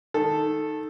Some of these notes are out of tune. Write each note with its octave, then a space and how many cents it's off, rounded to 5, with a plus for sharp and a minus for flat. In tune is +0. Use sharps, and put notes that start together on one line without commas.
D#3 +0 A4 +0